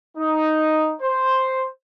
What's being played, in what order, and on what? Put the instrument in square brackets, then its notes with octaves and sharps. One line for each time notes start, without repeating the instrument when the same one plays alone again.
[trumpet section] D#4
C5